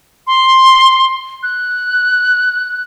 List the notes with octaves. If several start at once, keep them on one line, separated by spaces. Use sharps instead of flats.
C6
F#6